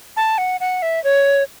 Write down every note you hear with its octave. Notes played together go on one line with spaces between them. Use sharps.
A5
F#5
F#5
E5
C#5